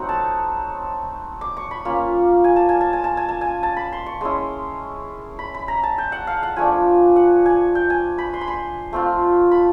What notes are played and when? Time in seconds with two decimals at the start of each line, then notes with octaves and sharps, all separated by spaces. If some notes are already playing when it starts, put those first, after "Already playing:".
Already playing: F#3 A3 C4 D#4 F#5
0.09 A5
1.41 D6
1.57 C#6
1.71 B5
1.85 A#3 C#4 F4
2.44 G#5
2.56 A5
2.69 G#5
2.81 A5
2.93 G#5
3.04 A5
3.17 G#5
3.29 A5
3.41 G#5
3.63 A5
3.77 B5
3.92 C6
4.06 C#6
4.21 G#3 C#4 E4 C6
5.39 B5
5.54 B5
5.68 A#5
5.83 A5
5.98 G5
6.12 F#5
6.27 F5
6.43 F#5
6.56 F3 A3 D4 G#5
7.16 F#5
7.46 G#5
7.75 G5
7.90 G#5
8.18 B5
8.34 C6
8.41 B5
8.48 C6
8.93 A3 C4 F4
9.51 B5